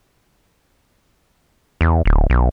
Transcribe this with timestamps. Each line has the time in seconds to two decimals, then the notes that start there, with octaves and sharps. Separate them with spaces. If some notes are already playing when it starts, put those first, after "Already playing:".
1.81 E2
2.06 D1
2.30 B1